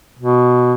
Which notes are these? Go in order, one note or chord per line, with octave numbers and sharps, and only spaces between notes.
B2